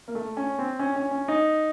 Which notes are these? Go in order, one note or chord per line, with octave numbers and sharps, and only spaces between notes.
A#3
A3
C#4
C4
C#4
C#4
C#4
D#4